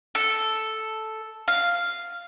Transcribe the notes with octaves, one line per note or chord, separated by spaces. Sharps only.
A4
F5